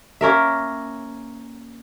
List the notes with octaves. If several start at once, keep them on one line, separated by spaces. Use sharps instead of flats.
A#3 C#4 A#4 E5